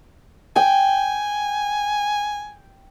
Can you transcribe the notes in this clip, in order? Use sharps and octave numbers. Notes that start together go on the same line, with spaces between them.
G5 G#5